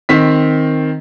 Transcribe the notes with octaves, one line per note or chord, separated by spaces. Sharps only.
D#3 C4 B6